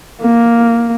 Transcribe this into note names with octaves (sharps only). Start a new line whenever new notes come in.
A#3